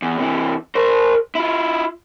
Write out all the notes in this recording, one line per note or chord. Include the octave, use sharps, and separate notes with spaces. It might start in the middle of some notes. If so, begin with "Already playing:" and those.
E2
C3 E3
A#4 C5
E4 F4